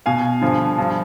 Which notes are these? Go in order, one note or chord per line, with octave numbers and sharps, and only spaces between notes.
B2 F5 G#5
G2 D3 F3
G2 F3